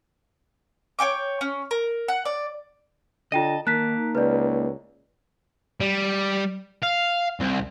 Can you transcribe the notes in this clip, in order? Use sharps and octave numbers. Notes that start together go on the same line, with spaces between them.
C#5 F5 G5 D6
C#4
A#4
F#5
D5
D3 F4 D#5 G5 A5 D#7
D#3 A#3 D#4 A5 F#6 B6
C#2 B4 D5
G3
F5
C2